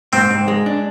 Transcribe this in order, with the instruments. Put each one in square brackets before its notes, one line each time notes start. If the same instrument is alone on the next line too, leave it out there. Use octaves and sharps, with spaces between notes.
[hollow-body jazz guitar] G#2 [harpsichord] C4
[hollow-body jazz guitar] G#2
G#3
D4